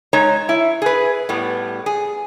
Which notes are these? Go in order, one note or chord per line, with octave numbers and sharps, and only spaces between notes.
G#3 D#4 C#5 A#5
E4
G#4 B4
A2 G3 B3
G#4